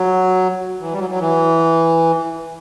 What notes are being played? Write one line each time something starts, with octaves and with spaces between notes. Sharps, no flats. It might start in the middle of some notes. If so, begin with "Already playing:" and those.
Already playing: F#3
E3
G3
F#3
F#3
E3